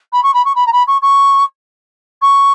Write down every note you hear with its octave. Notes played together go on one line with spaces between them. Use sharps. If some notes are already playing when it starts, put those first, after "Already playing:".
B5
C#6
B5
C#6
B5
A#5
B5
C#6
C#6
C#6